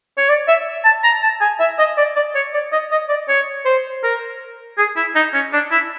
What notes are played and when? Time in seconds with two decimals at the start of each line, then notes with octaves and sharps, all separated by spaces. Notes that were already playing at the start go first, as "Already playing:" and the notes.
0.17 C#5
0.29 D5
0.48 E5
0.85 A5
1.04 A#5
1.23 A5
1.41 G#5
1.60 E5
1.79 D#5
1.98 D5
2.16 D5
2.35 C#5
2.54 D5
2.72 D#5
2.91 D#5
3.09 D5
3.29 C#5
3.65 C5
4.03 A#4
4.78 G#4
4.96 E4
5.15 D#4
5.34 C#4
5.53 D4
5.71 E4